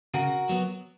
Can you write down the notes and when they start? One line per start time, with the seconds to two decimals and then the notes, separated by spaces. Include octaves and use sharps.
0.14 C#3 F#4 A#4
0.49 F#3 B3